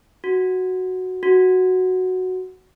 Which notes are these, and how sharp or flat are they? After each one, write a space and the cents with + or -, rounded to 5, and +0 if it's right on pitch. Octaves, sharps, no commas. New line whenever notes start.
F#4 +0
F#4 +0